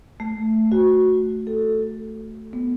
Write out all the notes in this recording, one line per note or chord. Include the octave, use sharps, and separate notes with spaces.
A3
F#4
A4
B3